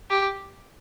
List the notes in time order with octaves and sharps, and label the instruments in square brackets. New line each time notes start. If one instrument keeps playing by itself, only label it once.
[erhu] G4